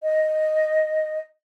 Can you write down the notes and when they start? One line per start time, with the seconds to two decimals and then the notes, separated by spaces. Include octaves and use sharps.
0.03 D#5